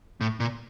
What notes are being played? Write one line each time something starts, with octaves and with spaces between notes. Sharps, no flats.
A2
A#2